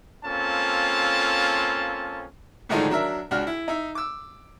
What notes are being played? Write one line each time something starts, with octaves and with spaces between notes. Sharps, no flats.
A#3 C4 C#4 F4 A4 A5
A2 D3 D#3 F3 G#3 D#4
F#3 D4 A#4 E5
C#2 D4 F#4 F6
E4
D#4 E5
D6 E6